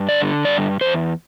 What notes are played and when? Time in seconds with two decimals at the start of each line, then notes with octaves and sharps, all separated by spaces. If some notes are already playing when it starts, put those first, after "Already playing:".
Already playing: G2
0.09 D3 D5
0.45 G2 D5
0.81 E2 C5